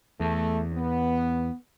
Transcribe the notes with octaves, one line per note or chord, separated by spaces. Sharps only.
E2 A3
B3